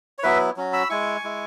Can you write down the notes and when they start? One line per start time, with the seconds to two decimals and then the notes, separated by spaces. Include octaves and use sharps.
0.18 C#5
0.23 F#3 B3 E4 B4 E5
0.56 F#3 C#4 F#4
0.73 B5 E6
0.90 G#3 E4 G#5 C#6
1.24 G#3 E4